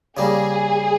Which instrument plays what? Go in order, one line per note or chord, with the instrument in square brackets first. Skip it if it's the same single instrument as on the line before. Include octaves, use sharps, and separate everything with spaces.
[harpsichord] C#3 G3 A#3 [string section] G#4